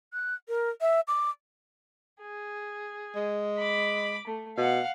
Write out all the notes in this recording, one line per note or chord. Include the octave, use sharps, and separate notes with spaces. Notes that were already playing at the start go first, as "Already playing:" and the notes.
F#6
A#4
E5
D6
G#4
G#3
B5 D6
A3
B2 F5 F#5